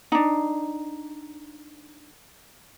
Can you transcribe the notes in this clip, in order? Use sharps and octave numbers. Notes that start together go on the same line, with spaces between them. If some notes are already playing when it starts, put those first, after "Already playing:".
D4 D#4